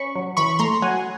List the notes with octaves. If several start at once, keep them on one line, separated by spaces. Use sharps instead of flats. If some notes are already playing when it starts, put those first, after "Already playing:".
Already playing: C#4 B5 C#6
F#3
E3 B5 C#6
A3 A#5 C6
F#3 F#5 G#5